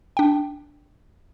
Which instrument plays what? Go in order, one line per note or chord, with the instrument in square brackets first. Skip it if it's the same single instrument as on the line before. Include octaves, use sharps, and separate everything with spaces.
[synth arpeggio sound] D4 G5